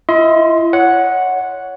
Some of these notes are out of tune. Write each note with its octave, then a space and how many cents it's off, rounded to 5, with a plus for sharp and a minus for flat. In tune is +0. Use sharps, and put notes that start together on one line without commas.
E4 +40 D#5 +40 C6 +0
C#5 +15 F#5 -5